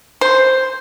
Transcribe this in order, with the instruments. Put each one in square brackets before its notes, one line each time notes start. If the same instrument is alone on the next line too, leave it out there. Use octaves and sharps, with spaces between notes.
[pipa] C5